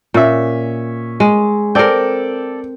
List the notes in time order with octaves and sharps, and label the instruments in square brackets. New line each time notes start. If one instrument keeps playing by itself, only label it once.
[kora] A#2 [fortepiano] C#4 E5
[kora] G#3
[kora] C4 A#4 [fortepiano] A4 D5 G5